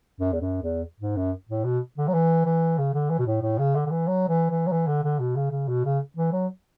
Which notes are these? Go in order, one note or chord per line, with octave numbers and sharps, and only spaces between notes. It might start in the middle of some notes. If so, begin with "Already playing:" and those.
F#2
E2
F#2
E2
G#2
F#2
A2
B2
D3
F#3
E3
E3
C#3
D3
E3
B2
A2
A2
C#3
D3
D3
E3
F#3
E3
E3
F#3
E3
D3
D3
B2
C#3
C#3
B2
C#3
E3
F#3